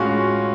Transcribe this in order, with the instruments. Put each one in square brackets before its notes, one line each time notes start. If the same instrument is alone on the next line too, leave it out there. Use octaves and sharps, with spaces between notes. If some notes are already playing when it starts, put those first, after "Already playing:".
Already playing: [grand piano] A2 G#3 C#4 F4 F#4